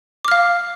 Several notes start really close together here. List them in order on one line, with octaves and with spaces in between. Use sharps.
D6 F6 F5